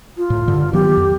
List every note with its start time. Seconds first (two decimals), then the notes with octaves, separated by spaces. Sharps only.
0.17 F4
0.30 A2
0.48 G2 D3
0.73 D#3 F#3 B3 G4
0.97 F2